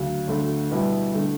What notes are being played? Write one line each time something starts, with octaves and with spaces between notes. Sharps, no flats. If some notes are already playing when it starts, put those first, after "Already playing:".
Already playing: D2 C#3 F#3
D2 D3 A3
B2 G3 B3 E4
D3 A3